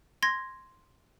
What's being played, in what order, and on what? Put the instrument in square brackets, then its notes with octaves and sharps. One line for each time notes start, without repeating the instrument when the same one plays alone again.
[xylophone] C6 G#6 A#6